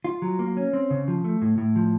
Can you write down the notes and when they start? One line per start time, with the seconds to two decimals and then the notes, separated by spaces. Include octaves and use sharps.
0.04 F4
0.22 F#3
0.39 A#3
0.57 C#4
0.73 C4
0.90 C#3
1.08 F3
1.24 A3
1.42 A2
1.58 A2
1.76 F3